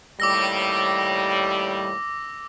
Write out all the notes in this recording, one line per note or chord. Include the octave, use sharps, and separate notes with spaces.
D#2 A2 G3 D6 E6 A#6